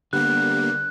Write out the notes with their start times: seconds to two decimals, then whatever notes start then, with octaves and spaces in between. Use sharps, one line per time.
0.13 D3 G3 A#3 B3 F#6